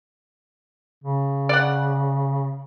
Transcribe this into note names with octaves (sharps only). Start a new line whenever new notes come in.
C#3
D5 F#5